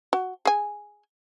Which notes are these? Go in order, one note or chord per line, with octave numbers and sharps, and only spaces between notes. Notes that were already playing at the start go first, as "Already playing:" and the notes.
F#4
G#4 G#5